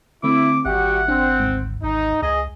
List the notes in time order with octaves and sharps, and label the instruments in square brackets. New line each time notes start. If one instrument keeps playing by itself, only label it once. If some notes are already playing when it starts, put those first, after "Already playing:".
[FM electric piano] D3 A3 C4 [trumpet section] E4 [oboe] D6
[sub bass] G#1 [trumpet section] G3 F#4 G4 [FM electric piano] E5 G5 [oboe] F#5
[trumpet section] C4 [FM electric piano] D4
[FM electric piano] D2 G#2
[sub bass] G#1 [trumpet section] D#4
[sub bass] C#2 [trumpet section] G#4 [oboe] D#5